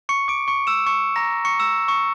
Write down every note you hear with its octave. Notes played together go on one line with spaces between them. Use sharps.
C#6 C#7
D6 D7
C#6 C#7
E6 E7
C#6 C#7
A#5 A#6
C#6 C#7
E6 E7
C#6 C#7